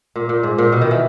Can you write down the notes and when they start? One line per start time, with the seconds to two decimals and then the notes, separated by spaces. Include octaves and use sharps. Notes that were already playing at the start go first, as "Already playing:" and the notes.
0.16 A#2
0.29 A#2
0.43 G#2
0.58 A#2
0.72 B2
0.81 D#3
0.91 E3